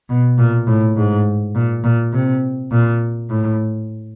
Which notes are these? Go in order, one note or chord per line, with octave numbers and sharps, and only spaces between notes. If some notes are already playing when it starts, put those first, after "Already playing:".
B2
A#2
A2
G#2
A#2
A#2
C3
A#2
A2